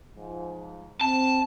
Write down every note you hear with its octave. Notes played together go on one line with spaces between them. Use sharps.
G#2 F3
C4 A5